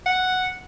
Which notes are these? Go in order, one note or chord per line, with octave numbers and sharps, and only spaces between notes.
F#5